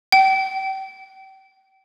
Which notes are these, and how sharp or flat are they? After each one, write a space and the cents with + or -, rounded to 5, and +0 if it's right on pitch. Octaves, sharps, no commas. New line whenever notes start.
G5 -35